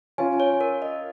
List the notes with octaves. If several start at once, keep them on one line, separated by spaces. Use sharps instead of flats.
C#4 F4 G#5
C#5
A#4
D#5